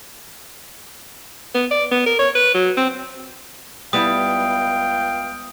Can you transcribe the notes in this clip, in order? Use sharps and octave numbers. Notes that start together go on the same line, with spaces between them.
B3
D5
B3
A#4
C#5
B4
F#3
C4
C#2 G3 B3 E4 F5 G5 D#6